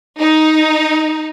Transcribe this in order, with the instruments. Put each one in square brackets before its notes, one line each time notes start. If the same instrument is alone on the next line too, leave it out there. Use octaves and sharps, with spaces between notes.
[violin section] D#4